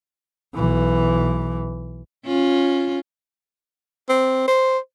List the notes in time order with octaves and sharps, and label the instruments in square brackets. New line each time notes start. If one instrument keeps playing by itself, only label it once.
[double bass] B1 E3
[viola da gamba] C#4 F4
[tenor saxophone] C4
C5